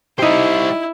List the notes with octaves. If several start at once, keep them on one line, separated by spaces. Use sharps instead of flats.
G3 D#4 E4 G4 C5